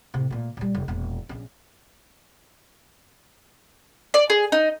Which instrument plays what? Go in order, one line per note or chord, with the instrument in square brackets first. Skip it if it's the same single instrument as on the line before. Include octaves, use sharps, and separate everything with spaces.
[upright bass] A2 C3
A#2 A3
A#2 G3
F1
E1 A#2
A#1 C#4
[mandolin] D5
G#4
D#4